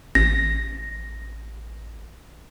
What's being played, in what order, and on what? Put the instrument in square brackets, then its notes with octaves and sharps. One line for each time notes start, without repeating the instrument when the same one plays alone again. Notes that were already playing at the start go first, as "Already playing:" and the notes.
[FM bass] A1 [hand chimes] A#6